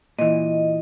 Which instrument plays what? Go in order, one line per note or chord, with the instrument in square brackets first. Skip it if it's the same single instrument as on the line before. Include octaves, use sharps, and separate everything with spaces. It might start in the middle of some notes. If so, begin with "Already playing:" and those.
[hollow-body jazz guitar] A#2 E3 [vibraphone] D#5